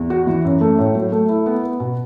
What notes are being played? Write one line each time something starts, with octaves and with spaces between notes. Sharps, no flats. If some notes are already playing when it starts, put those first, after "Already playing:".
Already playing: E2
F#4
E3
F#2
A3
A2
F#3
A3
E4
B3
B3
B2